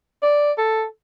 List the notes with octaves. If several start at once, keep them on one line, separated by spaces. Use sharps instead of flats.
D5
A4